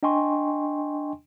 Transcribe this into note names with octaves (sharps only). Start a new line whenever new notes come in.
D4 D#5 G5 G#5 C6 C#6